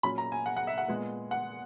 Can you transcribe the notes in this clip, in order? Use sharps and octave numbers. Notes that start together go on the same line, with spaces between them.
A#2 F#3 C#4 B5
A#5
G#5
F#5
F#5
E5
F#5
A#2 G#3 B3
F#5